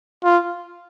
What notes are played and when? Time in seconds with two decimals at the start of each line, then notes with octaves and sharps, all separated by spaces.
0.24 F4